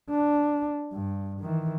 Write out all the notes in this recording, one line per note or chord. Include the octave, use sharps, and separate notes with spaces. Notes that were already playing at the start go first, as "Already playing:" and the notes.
D4
G2
D#3 E3